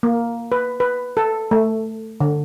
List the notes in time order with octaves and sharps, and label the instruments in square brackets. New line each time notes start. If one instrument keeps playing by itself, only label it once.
[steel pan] A#3
B4
B4
A4
A3
D3